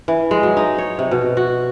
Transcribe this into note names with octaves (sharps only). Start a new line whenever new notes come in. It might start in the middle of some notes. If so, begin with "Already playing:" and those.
E3
G#3
F#3
D#4
C#5
C3
B2
F#4